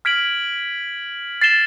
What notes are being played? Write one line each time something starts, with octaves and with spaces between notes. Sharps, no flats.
F6 G#6 B6 D7 F#7
A6 C7 E7 G7